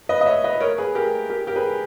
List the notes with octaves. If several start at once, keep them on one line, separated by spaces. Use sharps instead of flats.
B4 D#5
D#5
C#5 E5
B4 D#5
A#4 C#5
G#4 B4
G4 A#4
G4 A#4
G4 A#4
G#4 B4